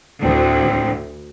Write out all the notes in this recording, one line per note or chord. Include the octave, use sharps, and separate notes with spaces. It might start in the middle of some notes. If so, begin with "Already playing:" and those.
D2 A2 C4 D4